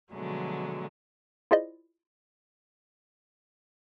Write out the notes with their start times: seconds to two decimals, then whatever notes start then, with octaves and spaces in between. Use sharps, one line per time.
0.12 B2 D3 F3 F#3 G#3 A3
1.51 E4 F4 G#4 C5 D5 D#5